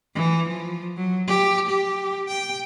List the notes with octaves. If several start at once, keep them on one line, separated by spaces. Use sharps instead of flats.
E3
F3
F#3
G4
G4
G5